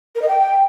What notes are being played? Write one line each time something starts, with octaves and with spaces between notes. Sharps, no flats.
A#4
D#5
G5